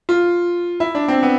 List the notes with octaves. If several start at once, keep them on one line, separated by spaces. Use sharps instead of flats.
F4
E4
D4
C4
B3